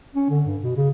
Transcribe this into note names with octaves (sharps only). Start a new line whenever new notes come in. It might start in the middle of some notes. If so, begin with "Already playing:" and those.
C#4
D3
G2
B2
C#3